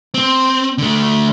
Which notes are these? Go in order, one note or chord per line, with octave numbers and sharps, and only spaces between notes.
C4
D3 A3